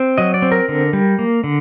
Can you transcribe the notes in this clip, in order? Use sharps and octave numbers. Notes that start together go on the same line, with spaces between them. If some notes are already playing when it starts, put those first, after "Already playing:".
Already playing: C4
F#3 D#5
D5
C4
A#4
D3
G3
A#3
D3